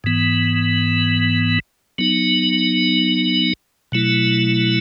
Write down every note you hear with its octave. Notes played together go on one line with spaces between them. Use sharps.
G#2 E3 B3
F#3 B3 D#4
B2 F#3 A3 E4